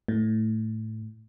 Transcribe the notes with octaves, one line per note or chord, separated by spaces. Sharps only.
A2